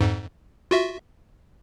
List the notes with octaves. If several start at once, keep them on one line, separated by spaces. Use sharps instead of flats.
F2 G#2
F4 F#4 E5